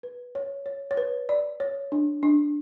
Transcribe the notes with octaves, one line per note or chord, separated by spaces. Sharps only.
B4
C#5
C#5
C#5
B4
D5
C#5
D4
D4